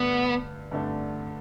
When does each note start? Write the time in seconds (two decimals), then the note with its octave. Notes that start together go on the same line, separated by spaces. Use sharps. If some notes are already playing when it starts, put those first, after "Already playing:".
Already playing: G2 D3 A3 B3 D4
0.71 G2 D3 A3 D4